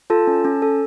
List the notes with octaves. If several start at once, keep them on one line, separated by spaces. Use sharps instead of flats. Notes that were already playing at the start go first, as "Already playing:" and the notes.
F4 A4 A5
C#4
C#4
A4